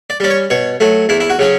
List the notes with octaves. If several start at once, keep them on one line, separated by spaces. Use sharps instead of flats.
D5
G3 C#4 D5
C#5
B2 C#5
F#3 A3
E2 E4
E4
F#4
C#3 F#3 C#4